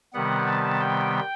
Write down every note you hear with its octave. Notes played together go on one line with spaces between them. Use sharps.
C3 D#3 G3 B3 F#5
A5
G5